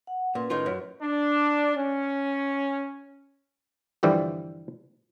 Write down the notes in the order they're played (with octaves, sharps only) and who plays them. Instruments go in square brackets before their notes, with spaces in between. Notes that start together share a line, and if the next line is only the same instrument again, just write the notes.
[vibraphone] F#5
[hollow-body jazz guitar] A#2 [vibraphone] C#4 B4 C6
[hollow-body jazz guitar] A2 D#3 F4
[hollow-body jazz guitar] F#2 [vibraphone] C#5
[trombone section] D4
C#4
[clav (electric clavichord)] G2 D3 E3 F3 G3